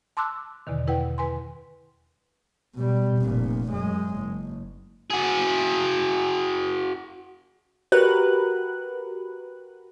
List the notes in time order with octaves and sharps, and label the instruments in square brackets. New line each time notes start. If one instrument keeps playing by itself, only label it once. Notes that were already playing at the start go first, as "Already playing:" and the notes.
[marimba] A5 C6 D6 E6 F#6
E2 B2 D3 D#3
E4 B4 F#5 G5
B4 G#5 C6
[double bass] B2 G3
F1 A#2
F#2 G#3
F#1
[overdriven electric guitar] F#4 G#4
[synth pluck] F#4 G4 A#4 B4 F#6